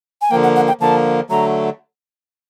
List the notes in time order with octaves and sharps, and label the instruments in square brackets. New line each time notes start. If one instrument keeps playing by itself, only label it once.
[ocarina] G#5
[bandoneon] D3 F3 A#3 [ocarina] G5
[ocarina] F#5
F#5
G5
[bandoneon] D3 F3 A#3 [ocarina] A5
[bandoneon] D3 F#3 A3 [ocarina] A#5